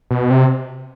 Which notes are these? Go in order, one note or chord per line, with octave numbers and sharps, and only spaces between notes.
B2
C3